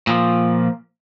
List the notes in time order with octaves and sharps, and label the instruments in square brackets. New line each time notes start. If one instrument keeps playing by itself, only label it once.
[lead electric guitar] A#2 F3